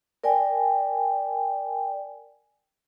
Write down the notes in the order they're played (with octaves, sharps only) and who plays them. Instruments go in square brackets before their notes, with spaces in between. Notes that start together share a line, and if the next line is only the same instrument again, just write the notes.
[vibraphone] A#4 D5 G5 G#5